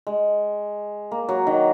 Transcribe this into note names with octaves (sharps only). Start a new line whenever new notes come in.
G#3
A#3
F#3
D#3